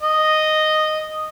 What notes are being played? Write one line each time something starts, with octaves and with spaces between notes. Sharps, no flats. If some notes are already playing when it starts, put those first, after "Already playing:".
D#5